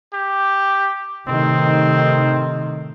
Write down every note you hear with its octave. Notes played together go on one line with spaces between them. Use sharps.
G4
A2 C3 D#3 C4